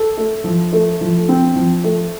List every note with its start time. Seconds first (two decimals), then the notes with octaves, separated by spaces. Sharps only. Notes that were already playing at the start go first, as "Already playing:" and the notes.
Already playing: A4
0.17 A3
0.44 F3
0.73 A3
1.01 F3
1.29 C4
1.56 F3
1.84 A3